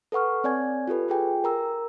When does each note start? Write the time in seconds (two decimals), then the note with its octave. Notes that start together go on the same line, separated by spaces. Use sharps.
0.12 A4 B4 F#5 C#6 F6
0.44 C4 C#5 D5 G#5 G#6
0.88 F4 G4 A4 B4
1.08 F4 G#4 G5 G#5
1.44 A#4 A#5 E6